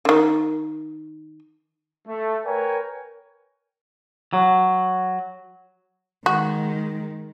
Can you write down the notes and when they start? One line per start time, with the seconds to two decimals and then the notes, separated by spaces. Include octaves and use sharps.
0.05 D3 D#3
2.08 A3
2.46 A#4 B4 C#5 G5 G#5 A#5
4.33 F#3
6.26 D#3 G#3 F#4